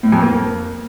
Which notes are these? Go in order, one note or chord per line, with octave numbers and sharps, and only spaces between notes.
A2
F2
A#3